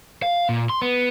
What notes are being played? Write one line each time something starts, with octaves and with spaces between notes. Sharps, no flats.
F5
A#2
C6
B3